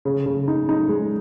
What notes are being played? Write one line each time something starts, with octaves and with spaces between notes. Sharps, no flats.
C#3
C#3
D#4
D#4
G#3